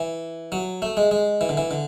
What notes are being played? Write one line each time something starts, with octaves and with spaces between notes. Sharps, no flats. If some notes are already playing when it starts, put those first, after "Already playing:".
Already playing: E3
F#3
A3
G#3
G#3
E3
D3
E3
D3